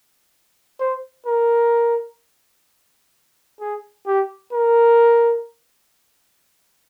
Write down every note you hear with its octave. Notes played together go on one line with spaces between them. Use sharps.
C5
A#4
G#4
G4
A#4